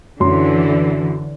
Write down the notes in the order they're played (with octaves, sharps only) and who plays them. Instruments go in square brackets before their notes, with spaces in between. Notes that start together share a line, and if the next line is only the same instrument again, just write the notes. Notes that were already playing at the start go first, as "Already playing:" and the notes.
[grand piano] F#2 C6 [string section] D3 E3